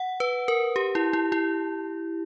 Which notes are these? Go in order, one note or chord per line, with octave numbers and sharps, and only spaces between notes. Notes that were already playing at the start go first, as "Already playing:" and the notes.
Already playing: F#5
B4
A#4
G4
E4
E4
E4